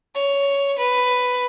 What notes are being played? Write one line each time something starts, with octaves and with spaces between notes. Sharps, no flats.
C#5
B4